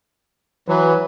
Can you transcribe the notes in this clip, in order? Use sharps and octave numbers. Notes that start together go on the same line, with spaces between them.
E3 F#3 B4